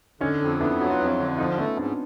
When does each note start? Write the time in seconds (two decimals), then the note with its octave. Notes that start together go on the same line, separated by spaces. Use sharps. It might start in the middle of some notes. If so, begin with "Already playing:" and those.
0.21 D3 C#4 D#4
0.40 F2
0.60 B3 D4 E4
0.79 F#3 F#4
0.90 F4
0.99 F2 E4 F#4
1.18 D3
1.33 E4
1.38 F3 D#4 F4
1.57 A3 B3 C#4
1.77 G#2 C4 D4